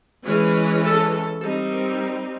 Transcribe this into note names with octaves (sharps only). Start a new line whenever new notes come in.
E3 G#3 C#4 G#4
A4
A4
G3 C4 D#4 A4
A#4